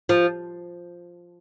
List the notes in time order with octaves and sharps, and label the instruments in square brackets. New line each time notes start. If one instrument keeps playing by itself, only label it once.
[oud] F3